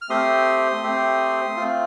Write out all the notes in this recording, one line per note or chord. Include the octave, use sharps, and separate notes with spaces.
F6
A3 C4 G4 C6 D#6
A3 C4 G4
A3 C4 F4